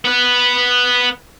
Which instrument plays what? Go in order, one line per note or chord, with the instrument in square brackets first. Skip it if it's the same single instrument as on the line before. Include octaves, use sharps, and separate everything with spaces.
[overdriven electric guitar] B3 B4